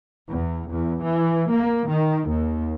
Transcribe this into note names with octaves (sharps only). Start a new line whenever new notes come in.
E2
E2
E3
A#3
D#3
D#2